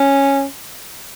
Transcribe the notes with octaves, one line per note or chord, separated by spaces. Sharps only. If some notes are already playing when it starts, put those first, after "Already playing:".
Already playing: C#4